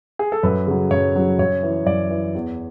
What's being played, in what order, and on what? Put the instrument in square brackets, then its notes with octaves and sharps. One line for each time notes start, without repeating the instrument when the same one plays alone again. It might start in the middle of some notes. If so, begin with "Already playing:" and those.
[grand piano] G#4
A4
F#2 B4
C#3 F#3
F#2 C#5
C#3 F#3
F#2 C#5
E3
F#2 D5
E3
E2